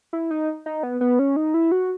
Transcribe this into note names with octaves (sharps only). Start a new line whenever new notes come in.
E4
D#4
D#4
B3
B3
C#4
D#4
E4
F#4